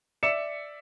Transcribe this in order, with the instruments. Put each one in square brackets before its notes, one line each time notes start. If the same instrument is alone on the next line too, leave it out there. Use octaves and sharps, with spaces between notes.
[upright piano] D5 E5 C#7 E7